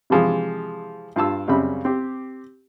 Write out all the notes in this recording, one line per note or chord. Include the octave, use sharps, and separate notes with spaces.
C3 E3 F3 G#3 G#4
G2 F4 A5 E6
F#2 C#3 G3 C4 B5
C4 G4